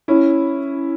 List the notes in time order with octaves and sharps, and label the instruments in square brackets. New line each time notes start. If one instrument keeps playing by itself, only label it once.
[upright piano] C#4 E4